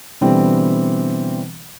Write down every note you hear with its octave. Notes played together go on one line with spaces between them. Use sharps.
B2 D3 E3 G3 C4